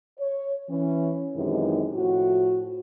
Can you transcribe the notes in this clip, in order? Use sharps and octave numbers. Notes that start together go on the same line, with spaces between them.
C#5
E3 C#4
F#2 C3 D#3 E3 G#3 D#4
A2 F3 E4 F#4